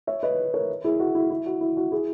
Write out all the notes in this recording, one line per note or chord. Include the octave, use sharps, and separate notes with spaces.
C#5 E5
B4 D#5
A#4 C#5
E4 G#4
F#4
E4
E4
F#4
E4
F#4
E4 G#4